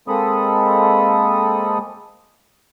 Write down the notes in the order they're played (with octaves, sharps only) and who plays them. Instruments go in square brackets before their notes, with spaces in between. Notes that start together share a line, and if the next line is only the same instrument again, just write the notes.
[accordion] G#3 A#3 C4 A4 B5 D#6